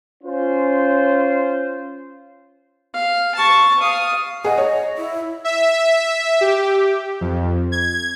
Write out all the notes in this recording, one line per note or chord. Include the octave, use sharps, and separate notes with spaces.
C#4 F4 C5
F5
A5 C#6
F5 D#6
G#4 D#5 F#5
C#5
E4
E5
G4
F2
G#6